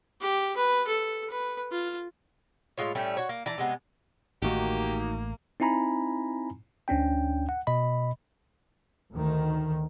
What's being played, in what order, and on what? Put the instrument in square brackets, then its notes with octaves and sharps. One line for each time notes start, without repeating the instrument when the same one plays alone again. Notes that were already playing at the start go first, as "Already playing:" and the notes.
[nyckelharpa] G4
B4
A4
B4
F4
[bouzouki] A2 G#3 F4 C#5
A2 G3 A3 C#4
F#4 C#5
A#3
E3 D5 A5 A#5
C3 G#3 B3
[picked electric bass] A1 A3 [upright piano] D#3 D#4 F#4 [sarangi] A#3 [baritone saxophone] G4
[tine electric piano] C4 D#4 E4 G#5 A#5 B5
D2 C#4 D4 G5
F#5
B2 D#5 B5
[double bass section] D2 D#3